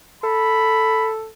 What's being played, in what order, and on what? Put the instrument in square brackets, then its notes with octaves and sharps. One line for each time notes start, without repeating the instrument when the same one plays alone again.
[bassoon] A4 [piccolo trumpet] B5